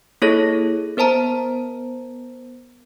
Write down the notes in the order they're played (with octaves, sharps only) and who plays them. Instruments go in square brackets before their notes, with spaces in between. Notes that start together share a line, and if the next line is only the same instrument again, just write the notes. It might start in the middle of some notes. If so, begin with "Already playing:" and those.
[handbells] A#3 E4 G#4 A4 C#5 A#6
B3 A#4 C5 A5 A#5